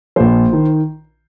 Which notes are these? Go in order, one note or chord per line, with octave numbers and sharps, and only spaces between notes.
A#1 A#2 F3 C5
D#3